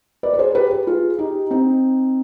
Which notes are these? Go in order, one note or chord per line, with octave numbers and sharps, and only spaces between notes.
B4 D5
B4
G#4 C5
G4 B4
G4 B4
F4 G#4
D#4 G4
C4 D#4